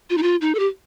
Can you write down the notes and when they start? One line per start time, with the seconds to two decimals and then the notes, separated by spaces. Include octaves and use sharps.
0.10 F4
0.18 D#4
0.23 F4
0.41 D#4
0.55 A4
0.59 G4